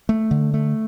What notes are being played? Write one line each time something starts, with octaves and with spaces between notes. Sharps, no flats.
A3
D3
A3